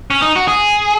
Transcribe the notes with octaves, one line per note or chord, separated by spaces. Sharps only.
C#4
D#4
F#4
G#4